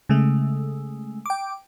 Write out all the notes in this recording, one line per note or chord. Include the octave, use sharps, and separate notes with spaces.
C#3 G#3 A3
G5 D6